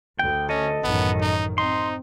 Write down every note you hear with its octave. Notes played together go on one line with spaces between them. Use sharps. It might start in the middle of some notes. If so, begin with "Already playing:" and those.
D2 G5
C#4 A4 D#5
A1 F#2 D#3 B3
D#4
C4 D#4 C6